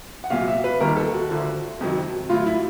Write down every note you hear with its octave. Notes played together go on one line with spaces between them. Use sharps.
F#5
C2 A#2 F#3 F5
E5
B4
D#2 D#3 G3 A#4
A4
F#4
D2 D3 F3
F2 C3 D#3 F#3
A2 F#3 F4
E4